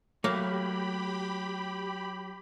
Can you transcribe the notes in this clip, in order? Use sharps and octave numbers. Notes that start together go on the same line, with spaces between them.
F#3 A3 A#3 G4 C#5 B5